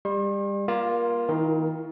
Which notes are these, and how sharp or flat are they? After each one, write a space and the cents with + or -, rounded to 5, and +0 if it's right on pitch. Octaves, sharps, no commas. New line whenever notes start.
G3 +30 C6 +45
A#3 +25 F4 +0
D#3 +35 E4 +0 A#4 +5